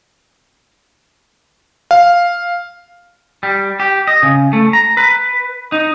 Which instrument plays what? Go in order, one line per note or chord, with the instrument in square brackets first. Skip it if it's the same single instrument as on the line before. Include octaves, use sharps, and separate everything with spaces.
[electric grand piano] F5
[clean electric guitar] G3
G4
D#5
C#3
A3
A#5
B4
D#4